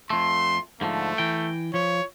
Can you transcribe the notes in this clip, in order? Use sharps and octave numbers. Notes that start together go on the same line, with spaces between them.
F2 A3 C6
G#2 D3 F3 A3
E3 G5
F3 C#5